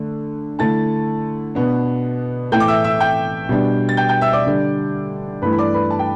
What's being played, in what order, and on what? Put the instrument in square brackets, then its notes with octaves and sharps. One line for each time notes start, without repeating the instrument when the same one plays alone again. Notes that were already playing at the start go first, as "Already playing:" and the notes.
Already playing: [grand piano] D3 A3 D4
D3 A3 E4 A5 A6
B2 B3 D4
A2 E3 A3 G5 G6
D6
E5 E6
E5 E6
G5 G6
B2 G3 D4
A6
G5 G6
G5 G6
E5 E6
D5 D6
D3 G3 D4
G2 E3 A3 E4 B4 B5
B5
D5 D6
B4 B5
A5
G5